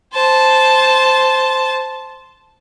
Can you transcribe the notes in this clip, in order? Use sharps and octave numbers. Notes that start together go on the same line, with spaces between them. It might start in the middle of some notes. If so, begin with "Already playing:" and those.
C5 A5